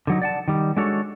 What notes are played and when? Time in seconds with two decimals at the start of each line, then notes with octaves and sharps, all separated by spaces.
0.07 D3 F#3 D#4
0.22 D5 F#5 A5
0.48 D#3 G3
0.77 G#3 D4 F#4 A4 C#5